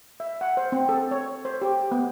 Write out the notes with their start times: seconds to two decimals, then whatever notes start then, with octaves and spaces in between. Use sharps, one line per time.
0.20 E5
0.41 F#5
0.57 C5
0.72 C4
0.89 A4
1.11 C#5
1.45 C5
1.62 G4
1.91 B3